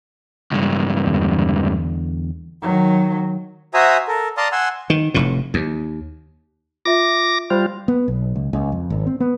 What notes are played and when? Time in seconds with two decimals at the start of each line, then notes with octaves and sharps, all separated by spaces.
0.51 C#2 G2
1.06 E2 D3 G3
2.62 D#3 F#3
3.74 F#4 C5 E5 G#5 A#5 D#6
4.08 A4 A#4
4.37 D5 F5 A5 A#5 C6 D#6
4.52 F#5 G#5 C6 E6
4.90 D#3
5.14 F1 A2
5.54 D#2
6.85 F4 E5 D6 A#6
7.50 G3 F4 C5 B5
7.88 B3
8.08 B1
8.36 C#2
8.53 C#2
8.72 F2
8.90 G#1
9.06 C4
9.20 B3